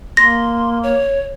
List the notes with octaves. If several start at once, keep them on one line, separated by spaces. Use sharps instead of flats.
A#3 C6 A#6
C#5